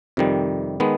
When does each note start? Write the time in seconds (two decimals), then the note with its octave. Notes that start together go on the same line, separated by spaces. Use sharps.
0.17 F2 C3 D#3 G3
0.80 D#3 G#3 B3